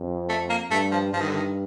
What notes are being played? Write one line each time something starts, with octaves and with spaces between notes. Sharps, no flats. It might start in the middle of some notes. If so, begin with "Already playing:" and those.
Already playing: F2
A3
A#3
G2 A3
F3
G2 F3
D#3
D3
D#3